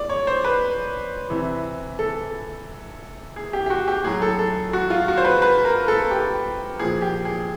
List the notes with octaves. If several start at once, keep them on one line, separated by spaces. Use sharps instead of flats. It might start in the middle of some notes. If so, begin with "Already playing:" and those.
Already playing: D5
C#5
C5
B4
C3 E3
A4
G#4
G4
G4
F#4
G4
A2 F#3 G#4
A4
A4
F#4
F4
F#4
C5
B4
B4
A#4
A4
G4
A#2 F3 G#4
G4
G#4